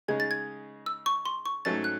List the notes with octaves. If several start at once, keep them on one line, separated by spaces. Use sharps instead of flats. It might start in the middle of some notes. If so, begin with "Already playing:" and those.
C#3 G#3 D#4 G#4 G#6
A6
G#6
E6
C#6
C6
C#6
G#2 F#3 A3 C#4 A6
F#6